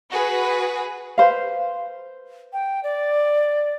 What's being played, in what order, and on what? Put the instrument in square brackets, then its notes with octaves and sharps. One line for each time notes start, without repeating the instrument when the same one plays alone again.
[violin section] F#4 G#4 B4
[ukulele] B4 C5 F5
[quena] G5
D5